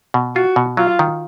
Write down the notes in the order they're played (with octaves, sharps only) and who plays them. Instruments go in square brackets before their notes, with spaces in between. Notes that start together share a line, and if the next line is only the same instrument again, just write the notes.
[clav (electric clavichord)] B2
[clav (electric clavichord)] F4 [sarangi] F#4
[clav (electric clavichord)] B2
[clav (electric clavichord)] F#3 [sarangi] F4
[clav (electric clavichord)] D#3